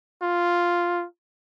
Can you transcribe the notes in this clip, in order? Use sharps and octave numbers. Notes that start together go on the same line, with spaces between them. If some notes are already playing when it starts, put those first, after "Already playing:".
F4